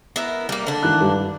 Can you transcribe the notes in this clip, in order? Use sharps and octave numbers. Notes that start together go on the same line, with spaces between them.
B3 E4 A#4
G3 A#3
D3 D4
D#3 E3 F#6
G2